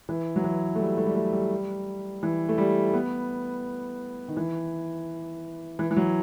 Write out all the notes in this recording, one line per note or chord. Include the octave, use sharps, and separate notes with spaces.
E3
F#3
E3
A3
G3
A3
G3
A3
G3
E3
A3
G3
B3
D#3
E3
E3
E3
F#3